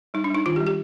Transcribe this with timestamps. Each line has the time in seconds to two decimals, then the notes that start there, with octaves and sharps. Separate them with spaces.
0.14 G3 D#4
0.24 D4
0.30 G3 D#4
0.46 D#3 F4
0.56 G4
0.61 G3
0.66 G4